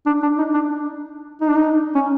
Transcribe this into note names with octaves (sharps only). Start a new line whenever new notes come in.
D4
D4
D#4
D4
D#4
D4
D#4
C#4